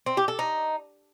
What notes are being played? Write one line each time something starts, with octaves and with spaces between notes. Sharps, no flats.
C4
G4
A4
D#4